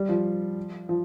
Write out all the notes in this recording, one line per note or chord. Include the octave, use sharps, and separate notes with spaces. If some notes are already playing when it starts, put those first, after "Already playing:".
Already playing: G3
F3
F3